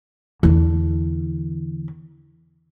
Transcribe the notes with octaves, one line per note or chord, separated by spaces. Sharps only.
E2 D3